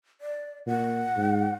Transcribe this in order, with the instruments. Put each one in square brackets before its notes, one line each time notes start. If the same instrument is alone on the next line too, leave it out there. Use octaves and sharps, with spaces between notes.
[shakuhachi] D5
[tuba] A#2 [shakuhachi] F#5
[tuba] G#2